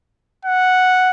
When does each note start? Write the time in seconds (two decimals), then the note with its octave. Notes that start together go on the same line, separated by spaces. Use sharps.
0.45 F#5